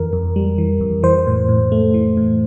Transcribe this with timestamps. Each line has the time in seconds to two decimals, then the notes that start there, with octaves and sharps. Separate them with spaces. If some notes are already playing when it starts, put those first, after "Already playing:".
Already playing: F2 E3 A#4
0.13 F2
0.36 G3
0.58 E3
0.81 F2
1.03 E3 C5
1.27 A2
1.49 A2
1.72 A3
1.94 E3
2.17 A2